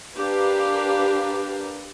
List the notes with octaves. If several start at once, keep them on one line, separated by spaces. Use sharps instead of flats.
D4 G4 A#4 B4 F5